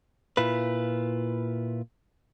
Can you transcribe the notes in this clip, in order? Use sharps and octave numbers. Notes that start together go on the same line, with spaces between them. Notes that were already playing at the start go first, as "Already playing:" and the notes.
A#2 E4 F4 B4